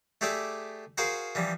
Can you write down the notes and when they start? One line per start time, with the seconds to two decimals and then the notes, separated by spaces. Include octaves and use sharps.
0.21 A3 G4 G#4 D5 E5
0.98 F#4 G#4 A#4 C5 F5
1.35 E3 F3 G3